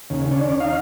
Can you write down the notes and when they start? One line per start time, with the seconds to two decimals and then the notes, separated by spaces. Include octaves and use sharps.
0.10 D#2 C#3
0.31 C#4 D4
0.60 D#4 F5